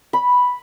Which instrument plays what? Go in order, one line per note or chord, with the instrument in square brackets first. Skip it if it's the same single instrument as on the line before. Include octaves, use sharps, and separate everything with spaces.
[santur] B5